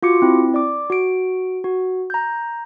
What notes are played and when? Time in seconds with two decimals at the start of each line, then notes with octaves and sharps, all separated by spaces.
0.03 F4 F#4 D6 C#7
0.22 C4 E4
0.54 D5 D6
0.90 F#4 D7
1.64 F#4
2.10 A#5 G6